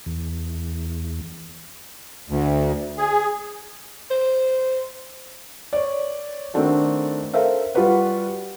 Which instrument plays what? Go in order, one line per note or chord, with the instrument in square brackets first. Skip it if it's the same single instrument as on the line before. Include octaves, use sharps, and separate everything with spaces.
[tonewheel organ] E2
[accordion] D2
G#4
[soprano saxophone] C5
[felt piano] C#5 D5
D#3 A3 C4 D4 F#4 A4
A4 A#4 C5 E5 F5
G3 F4 F#4 B4 F#5